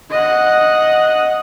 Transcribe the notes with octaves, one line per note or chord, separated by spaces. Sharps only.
D#5 F#5